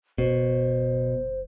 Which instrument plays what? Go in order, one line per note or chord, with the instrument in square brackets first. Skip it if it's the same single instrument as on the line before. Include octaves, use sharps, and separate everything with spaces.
[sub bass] F#1 [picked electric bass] B2 [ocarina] C5